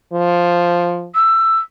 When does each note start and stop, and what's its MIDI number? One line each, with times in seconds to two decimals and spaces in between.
0.13 1.08 53
1.15 1.58 88